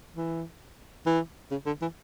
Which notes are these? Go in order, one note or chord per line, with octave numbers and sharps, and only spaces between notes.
E3
E3
C#3
D3
E3